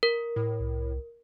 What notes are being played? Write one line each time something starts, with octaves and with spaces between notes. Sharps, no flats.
A#4
A2
C2